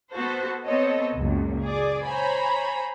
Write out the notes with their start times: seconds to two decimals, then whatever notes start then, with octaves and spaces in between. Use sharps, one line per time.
0.12 B3 F#4 A4 C5
0.64 B3 C4 A4 C#5 D#5
1.15 C#2 F#2 A#2
1.62 G#4 D5
2.05 C5 C#5 G#5 A#5 B5